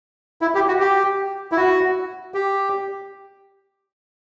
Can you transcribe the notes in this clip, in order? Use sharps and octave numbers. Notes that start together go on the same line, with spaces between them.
E4
G4
F#4
G4
E4
F#4
G4